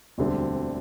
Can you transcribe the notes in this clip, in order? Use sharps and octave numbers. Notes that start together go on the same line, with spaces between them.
E1 D2 D3 G3 C4